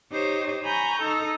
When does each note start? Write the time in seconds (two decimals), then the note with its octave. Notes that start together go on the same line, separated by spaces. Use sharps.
0.12 D#4 G4 C5 C#5
0.64 G#5 A#5 B5 C#6 G6
1.01 D#4 A4 A#5